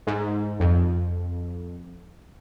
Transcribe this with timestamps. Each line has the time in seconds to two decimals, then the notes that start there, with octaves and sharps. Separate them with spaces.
0.07 G#2
0.60 F2